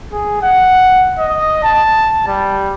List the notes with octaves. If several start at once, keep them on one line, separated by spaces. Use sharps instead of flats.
G#4
F#5
D#5
A5
G3